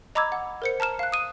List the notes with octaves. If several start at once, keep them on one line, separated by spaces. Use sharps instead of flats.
D#5 A#5 B5 D6 E6 G#6
F#5
A#4 C5 C#7
A5 A#5 F6 E7
F5 F#6
D#6 D#7